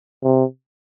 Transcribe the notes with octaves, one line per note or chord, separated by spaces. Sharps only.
C3